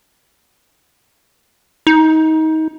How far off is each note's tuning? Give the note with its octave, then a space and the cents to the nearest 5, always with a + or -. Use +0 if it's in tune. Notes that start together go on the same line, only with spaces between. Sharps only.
D#4 +25